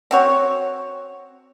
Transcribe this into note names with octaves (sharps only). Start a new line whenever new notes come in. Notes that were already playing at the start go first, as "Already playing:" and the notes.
C4 F#4 C#5